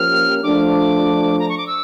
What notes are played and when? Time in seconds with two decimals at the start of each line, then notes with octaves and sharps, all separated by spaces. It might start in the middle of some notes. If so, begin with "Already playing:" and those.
Already playing: F3 A#3 C#4 G4 A#4 F6
0.43 F3 A3 D4 D6
1.39 A#5
1.49 C#6
1.58 D6
1.67 E6